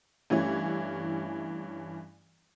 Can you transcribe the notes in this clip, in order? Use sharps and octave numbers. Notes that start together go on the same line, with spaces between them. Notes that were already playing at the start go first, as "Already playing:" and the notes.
G2 E3 A3 C#4 E4